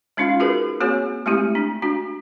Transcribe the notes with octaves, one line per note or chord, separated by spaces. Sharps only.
G#3 C#4 D#4 F4 F5
D#4 F#4 G#4 A#4 B4
A#3 C4 F#4 G#4 C#5 G#5
G#3 A3 C4 E4 G4
D4
D4 F#4